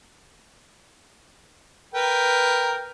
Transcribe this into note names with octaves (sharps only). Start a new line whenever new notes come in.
A#4 B4 G5